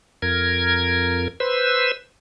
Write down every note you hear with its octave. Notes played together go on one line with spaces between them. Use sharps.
F2 A#4 G#6
B4 C5 E6